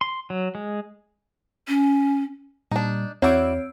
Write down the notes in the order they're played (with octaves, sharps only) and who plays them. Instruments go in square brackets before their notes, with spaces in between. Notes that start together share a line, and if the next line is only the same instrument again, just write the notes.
[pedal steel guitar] C6
F#3
G#3
[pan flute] C#4
[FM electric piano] A#2 G3 [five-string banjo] D4 D#4
[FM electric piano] E2 [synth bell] C4 E6 D7 [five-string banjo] E4 F#4 D5 [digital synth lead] C#5